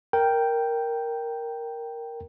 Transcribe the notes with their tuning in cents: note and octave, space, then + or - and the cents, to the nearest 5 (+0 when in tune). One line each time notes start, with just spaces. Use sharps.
A#4 +0 G5 +0